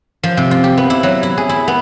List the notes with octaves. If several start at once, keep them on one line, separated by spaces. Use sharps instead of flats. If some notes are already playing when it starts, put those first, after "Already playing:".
F3
C3
F4
G4
B3
E4
F#3
E4
G#4
E4
B3